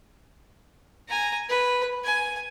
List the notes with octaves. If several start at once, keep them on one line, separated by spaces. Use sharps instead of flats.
G#5 A#5
B4
G#5